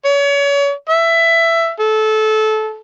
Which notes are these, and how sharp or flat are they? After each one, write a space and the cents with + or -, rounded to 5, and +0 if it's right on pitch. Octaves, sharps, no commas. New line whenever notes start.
C#5 +35
E5 +15
A4 -20